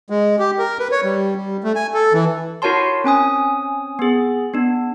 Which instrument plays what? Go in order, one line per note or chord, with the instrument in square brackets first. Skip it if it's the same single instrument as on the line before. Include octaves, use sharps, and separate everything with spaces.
[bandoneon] G#3
G4
A#4
B4
C#5
G3
G3
A3
G#5
A4
E3
[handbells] E4 F#4 A#4 C#5 A5 C6
C4 C#4 G#5 D#6
B3 G#4
B3 D4